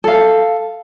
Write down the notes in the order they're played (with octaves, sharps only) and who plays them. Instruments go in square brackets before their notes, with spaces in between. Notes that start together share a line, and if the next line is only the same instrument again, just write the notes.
[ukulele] A4 F5